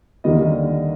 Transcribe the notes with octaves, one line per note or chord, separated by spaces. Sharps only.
D#2 D3 G3 A#3 D#5